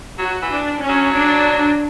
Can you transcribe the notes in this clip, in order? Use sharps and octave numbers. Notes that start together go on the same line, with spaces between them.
F#3 F#4
E3
D4
C#4
F#3
D4